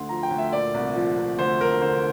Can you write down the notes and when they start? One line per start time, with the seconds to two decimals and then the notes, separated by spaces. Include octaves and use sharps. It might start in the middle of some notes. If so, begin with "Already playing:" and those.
Already playing: D2 D3 C6
0.09 F3 A#5
0.23 G5
0.31 D2
0.38 E5
0.52 A#2 D5
0.74 C2
0.95 F3
1.17 C2
1.38 D2 C5
1.60 E1 A#4
1.81 D3 C5